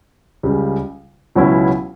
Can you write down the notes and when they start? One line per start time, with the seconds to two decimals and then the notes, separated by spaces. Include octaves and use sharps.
0.43 C#2 C#3 G3
1.35 C#2 B2 F#3 C#4 E4